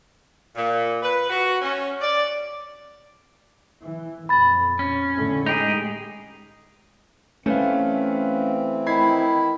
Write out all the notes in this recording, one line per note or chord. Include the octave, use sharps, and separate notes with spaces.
A#2
B4
F#4
C#4
D5
E3
F2 A#2 B5 A6
C#4
A2 D3
G#3 D#4 G4 G#4 F7
E3 A3 C4 C#4 B4 F5
D#3 E4 B5 G#6 C7